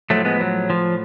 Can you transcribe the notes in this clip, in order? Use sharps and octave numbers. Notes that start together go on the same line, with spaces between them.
A2 F3 F#3 A3
G#3 B3
F#3
F3